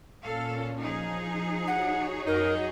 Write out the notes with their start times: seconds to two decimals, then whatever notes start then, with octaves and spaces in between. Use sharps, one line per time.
0.23 A#2 C#4 A4 F5
0.80 F3 D#4 G#4
1.67 F#4 C#5 F#5
2.27 F#2 D#4 G#4 A#4